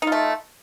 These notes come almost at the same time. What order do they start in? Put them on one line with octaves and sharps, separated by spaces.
D#4 F4 A3